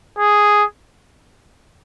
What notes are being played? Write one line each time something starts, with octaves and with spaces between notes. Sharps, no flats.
G#4